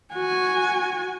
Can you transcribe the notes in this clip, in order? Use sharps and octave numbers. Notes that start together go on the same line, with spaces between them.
F#4 G#5